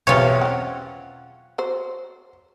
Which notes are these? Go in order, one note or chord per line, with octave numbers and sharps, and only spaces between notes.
B1 E2 G3 C4 F4 C#5
C4 C#4 F#5
F#3 C5